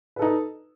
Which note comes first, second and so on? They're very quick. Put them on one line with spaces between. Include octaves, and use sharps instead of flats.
B4 A4 D#4